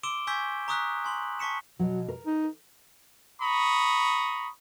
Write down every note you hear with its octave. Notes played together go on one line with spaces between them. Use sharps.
C6 D6 E6 D7 E7 G7
G#5 C#6 E6 G6 G#6 B6
A#5 C#6 D#6 E6 F#6 B6
G#5 C6 F#7
A5 C#6 B6 C#7 E7
B2 F#3
A#4
D#4
A#5 B5 C#6 D#6